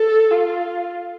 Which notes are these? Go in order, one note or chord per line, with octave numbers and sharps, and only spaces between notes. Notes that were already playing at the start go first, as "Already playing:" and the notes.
Already playing: A4
F4